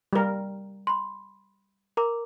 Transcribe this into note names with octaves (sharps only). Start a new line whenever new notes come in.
G3 A#4
B5 C6
A#4 A#5 D6